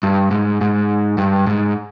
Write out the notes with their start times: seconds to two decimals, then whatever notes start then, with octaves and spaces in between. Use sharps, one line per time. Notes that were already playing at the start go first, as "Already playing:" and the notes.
0.03 G2
0.31 G#2
0.61 G#2
1.18 G2
1.47 G#2